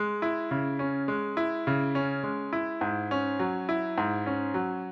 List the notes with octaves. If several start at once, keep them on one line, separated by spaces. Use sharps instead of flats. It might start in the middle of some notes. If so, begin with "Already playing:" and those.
Already playing: G#3
E4
C#3
C#4
G#3
E4
C#3
C#4
G#3
E4
G#2
C#4
F#3
E4
G#2
C#4
F#3